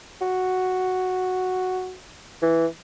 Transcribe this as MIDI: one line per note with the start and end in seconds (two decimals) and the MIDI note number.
0.21 1.95 66
2.42 2.66 52